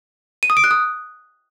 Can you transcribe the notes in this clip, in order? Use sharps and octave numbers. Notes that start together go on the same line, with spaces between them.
D#7
D#6
D7
F#6
D#6